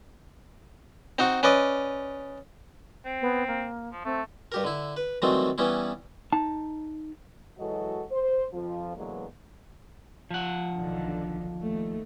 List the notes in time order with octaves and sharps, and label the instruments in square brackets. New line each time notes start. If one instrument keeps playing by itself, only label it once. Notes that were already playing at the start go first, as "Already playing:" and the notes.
[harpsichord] C4 D#4 F#4
C#4 B4 D5 D#5
[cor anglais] C4
[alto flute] B3
A#3
[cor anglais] F3
[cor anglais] A3 [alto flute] C4
[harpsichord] G2 G4 A#4
D3 E4
B4
D#3 E3 F#3 G3 A3 C4
E3 G3 B3 C#4 E4
[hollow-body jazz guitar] D#4 A5
[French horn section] E3 F#3 G#3 F#4 A4 D#5
C5
F2 F3
B2 D3 E3 F#3 G#3 A#3
[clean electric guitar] F3 F#5
[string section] B1 D3 D#3
D#2 A3